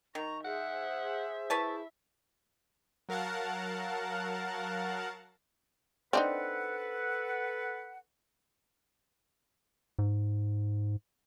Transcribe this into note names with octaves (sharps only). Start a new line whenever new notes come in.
D#3 A#5 C#6
G#4 C5 E5 F#5
E4 B4 C#5 A5
F#3 A#4 F5 F#5 A5
C4 D4 D#4 A4 B4 F#5
G#2